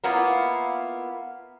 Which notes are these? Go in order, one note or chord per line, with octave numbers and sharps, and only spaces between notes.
A#3 B3 E4 F4